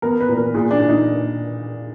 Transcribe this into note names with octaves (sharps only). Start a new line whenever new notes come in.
B3 A#4
B4
A#2
A#4
A#2 G#4
D4
A#2
D#4